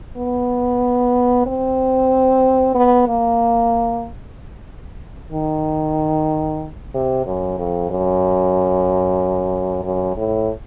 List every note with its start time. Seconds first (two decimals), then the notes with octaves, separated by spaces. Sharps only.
0.17 B3
1.46 C4
2.75 B3
3.08 A#3
5.32 D#3
6.94 C3
7.26 F#2
7.58 F2
7.90 F#2
9.83 F#2
10.16 A2